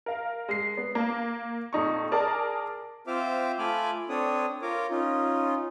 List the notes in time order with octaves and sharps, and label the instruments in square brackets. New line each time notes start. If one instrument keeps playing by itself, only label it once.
[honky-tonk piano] A#4 F5
G#3 C7
B3
A#3
A#1 F2 D#4 C#6
G#4 A#4 D5 A5
[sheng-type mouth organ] C4 F4 C5 E5 D6 F6
A3 F4 G#5 B5 D6 F6
C4 D4 A4 C#5 D#6
F4 A#4 C#5 D6
C#4 D#4 F4